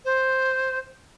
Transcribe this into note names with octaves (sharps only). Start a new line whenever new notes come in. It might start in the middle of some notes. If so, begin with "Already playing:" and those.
C5